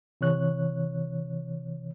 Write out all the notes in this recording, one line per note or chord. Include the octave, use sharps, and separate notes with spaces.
C3 E3 C#5 F#6